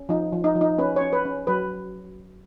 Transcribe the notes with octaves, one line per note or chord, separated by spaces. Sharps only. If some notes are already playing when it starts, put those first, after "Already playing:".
Already playing: C#4
F3 D#4
F3
D#4
F3
D#4
C#4 B4
C#5
C#4
B4
C#4
F#3 B4